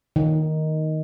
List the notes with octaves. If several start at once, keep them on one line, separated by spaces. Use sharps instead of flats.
D#3